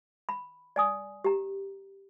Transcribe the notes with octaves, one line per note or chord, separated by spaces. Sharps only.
B5
D5 G#5 D#6
G4 A#5